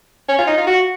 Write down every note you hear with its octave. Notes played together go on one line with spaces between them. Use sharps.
C#4
F4
D#4
F4
F#4